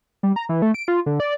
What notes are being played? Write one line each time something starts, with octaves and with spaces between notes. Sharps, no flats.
G3
A#5
E3
A3
D7
F4
D3
D5